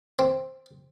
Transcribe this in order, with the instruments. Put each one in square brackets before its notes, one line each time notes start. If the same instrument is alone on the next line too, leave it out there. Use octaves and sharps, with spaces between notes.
[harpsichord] C4